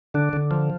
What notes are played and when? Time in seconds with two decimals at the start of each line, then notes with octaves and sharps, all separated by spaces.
0.14 D3 D4
0.33 D3
0.51 F3